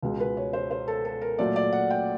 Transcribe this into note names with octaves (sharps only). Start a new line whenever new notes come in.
C#2 B2 G#3
B4
C#5
C5
C5
A4
A4
A#4
A#2 F#3 A3 D5
D5
F#5
G5